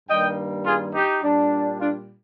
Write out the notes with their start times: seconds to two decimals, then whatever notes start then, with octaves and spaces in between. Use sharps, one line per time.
0.08 G2 D#3 G3 A#3 D#5 G5
0.65 F4 G#4
0.94 D#4 G4
1.23 A#2 G3 D4
1.79 D4 F4